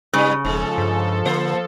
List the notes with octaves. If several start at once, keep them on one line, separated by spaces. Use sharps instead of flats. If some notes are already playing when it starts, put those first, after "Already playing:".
G2 C#3 G3 B4
E1 G#2 F3 G#3 A4
G2
D3 A#3 C5